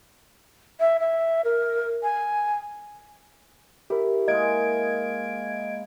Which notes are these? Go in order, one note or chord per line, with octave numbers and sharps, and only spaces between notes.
E5
E5
A#4
G#5
E4 G4 A#4
G#3 A#3 D#5 G#6 D7